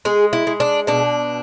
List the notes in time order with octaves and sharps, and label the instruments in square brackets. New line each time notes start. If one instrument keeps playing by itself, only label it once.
[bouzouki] G#3 G#4
E4
G#3
D4
B2 D4